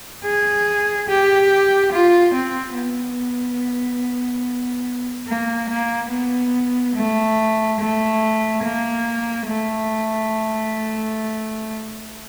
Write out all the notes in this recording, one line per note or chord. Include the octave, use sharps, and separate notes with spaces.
G#4
G4
F4
C4
B3
A#3
A#3
B3
A3
A3
A#3
A3